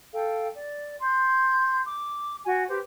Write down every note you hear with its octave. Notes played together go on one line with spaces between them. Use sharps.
A4 F5 G5
D5
C6 G6
D6
F#4 G#5
G4 B4 C5